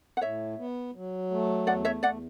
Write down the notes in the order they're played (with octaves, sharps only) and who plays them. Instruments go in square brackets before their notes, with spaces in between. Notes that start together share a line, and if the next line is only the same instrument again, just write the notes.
[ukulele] F#5
[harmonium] A2 [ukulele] C#5 E5
[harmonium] B3
F#3
A3
[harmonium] E2 [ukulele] D5 F#5
[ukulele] C#5 E5
[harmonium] E2 [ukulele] D5 F#5